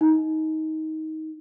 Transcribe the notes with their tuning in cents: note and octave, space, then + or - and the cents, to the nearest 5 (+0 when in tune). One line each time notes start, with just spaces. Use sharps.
D#4 +20